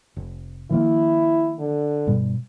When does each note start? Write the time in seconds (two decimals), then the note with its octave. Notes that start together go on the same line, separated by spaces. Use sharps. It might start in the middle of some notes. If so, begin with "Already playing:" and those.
0.16 F1
0.70 D#3 F3 A#3 E4
1.59 D3
2.07 G2 B2 G3